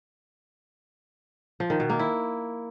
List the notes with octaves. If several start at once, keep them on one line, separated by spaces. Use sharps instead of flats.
F3
D#3
B2
A#3
E4